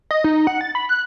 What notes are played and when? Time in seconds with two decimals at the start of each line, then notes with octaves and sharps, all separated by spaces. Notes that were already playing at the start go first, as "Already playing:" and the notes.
0.11 D#5
0.24 D#4
0.47 F#5
0.61 A6
0.75 B5
0.89 F#6